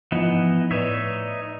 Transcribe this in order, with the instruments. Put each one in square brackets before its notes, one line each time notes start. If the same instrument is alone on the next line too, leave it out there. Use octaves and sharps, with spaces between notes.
[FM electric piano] G#2 F3 [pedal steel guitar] E3 B3 D#4
[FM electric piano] A2 B4 D5 [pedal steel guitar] D#4 C#5 E5